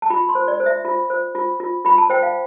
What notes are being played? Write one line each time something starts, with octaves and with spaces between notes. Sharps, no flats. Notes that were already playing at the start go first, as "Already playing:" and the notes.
A5
F4 B5
C6
C5
D5
C5
E5
F4
C5
F4
F4
F4 B5
A5
C5 G5
F5